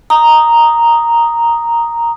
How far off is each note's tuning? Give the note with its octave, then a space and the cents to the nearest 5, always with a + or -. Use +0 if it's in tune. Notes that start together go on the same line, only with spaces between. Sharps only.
A#5 +0 D#6 +0